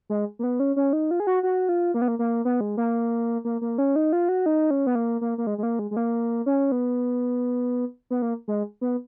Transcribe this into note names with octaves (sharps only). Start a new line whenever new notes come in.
G#3
A#3
B3
C#4
C#4
D#4
F4
G#4
F#4
F#4
F4
A#3
B3
A#3
A#3
B3
G#3
A#3
A#3
A#3
C#4
D#4
F4
F#4
D#4
C#4
B3
A#3
A#3
A#3
G#3
G#3
A#3
G#3
G#3
A#3
C#4
B3
B3
A#3
G#3
B3